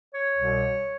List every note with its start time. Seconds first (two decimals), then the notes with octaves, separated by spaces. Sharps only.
0.13 C#5
0.34 C2 B2